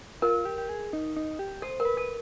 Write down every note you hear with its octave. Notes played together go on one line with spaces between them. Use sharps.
F4 A#4
G4
G4
G#4
D#4
D#4
G4
A4 C5
A#4
B4
A4